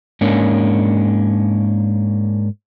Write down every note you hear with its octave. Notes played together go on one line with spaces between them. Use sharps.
G#2 A#3 C#4 D4